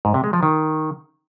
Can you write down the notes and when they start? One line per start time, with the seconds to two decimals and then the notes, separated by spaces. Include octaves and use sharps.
0.05 G#2
0.14 C3
0.24 G#3
0.33 F3
0.43 D#3